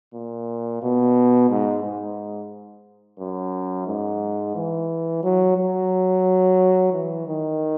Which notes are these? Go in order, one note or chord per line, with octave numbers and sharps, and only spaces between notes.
A#2
B2
G#2
G#2
F#2
G#2
E3
F#3
F#3
E3
D#3